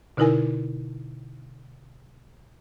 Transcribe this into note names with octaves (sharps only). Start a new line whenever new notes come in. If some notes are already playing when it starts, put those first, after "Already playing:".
B2 D3 D#4 E4 A#4 G#5